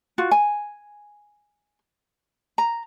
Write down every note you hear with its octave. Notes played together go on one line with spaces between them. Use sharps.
F4 F#4
G#5
A#5